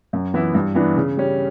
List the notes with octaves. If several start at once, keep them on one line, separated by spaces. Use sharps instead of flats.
F#2
E3 B3 E4
G2
E3 B3 D4
C#3
G3 C#4